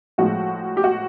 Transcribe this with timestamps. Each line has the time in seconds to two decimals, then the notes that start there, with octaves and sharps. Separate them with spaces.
0.18 A2 F3 G#3 F#4
0.77 G4
0.84 F#4